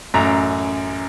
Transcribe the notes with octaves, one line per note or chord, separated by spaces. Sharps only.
A1 F#2 A#5